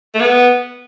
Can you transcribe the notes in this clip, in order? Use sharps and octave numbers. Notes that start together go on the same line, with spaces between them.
A3
B3